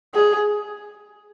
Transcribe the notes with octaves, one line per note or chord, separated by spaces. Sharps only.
G#4